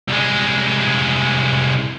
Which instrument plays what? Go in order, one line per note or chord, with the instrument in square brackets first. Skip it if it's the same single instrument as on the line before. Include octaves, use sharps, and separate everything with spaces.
[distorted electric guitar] C2 G#3